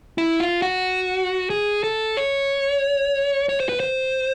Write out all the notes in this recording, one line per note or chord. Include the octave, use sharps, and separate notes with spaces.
E4
F4
F#4
G#4
A4
C#5
C#5
C5
B4
C5